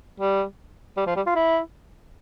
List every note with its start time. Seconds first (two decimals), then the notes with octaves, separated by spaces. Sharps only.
0.20 G3
0.97 G3
1.07 F3
1.16 G3
1.26 F4
1.35 E4